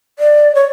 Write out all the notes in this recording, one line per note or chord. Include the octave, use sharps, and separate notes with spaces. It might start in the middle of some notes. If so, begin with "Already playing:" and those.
D5
C#5